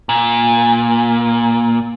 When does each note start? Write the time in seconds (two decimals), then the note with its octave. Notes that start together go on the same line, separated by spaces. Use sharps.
0.09 A#2